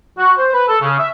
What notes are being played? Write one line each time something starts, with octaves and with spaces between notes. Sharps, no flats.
F#4
C5
B4
A4
C#3
E5